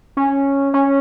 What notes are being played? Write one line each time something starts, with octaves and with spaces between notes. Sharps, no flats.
C#4
C#4